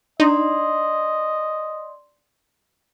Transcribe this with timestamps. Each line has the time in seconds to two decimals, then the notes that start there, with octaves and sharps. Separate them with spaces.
0.20 D4 D#4 D5 D#5 C6